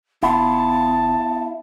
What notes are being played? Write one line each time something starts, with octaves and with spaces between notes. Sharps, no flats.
F1 B3 E4 F4 A5